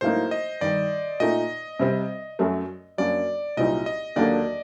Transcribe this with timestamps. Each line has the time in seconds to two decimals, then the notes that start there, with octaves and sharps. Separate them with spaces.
0.01 A2 F#3 A#3 D#4 C5
0.31 D#5
0.61 G2 D#3 G3 D5
1.20 A#2 A3 D#4 D#5
1.79 C3 G3 C4
2.39 F#2 F#3 A3
2.98 F#2 F#3 A#3 D4 D5
3.57 C2 A#2 F#3 C4 D#4 D#5
3.86 D#5
4.16 D#2 D3 F#3 A#3 D4 D5